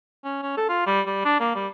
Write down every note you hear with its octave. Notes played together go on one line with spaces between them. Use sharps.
C#4
C#4
A4
F4
G3
G3
D4
A#3
G3